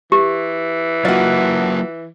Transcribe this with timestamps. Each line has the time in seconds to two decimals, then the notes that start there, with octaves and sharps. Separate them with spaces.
0.12 E3 G4
1.05 F#3 A#3 F4 F#4 D#5